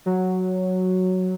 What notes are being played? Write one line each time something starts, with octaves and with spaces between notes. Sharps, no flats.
F#3